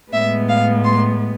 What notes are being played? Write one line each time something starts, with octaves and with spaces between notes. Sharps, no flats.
A2 G#3 B3 E5
F5
C6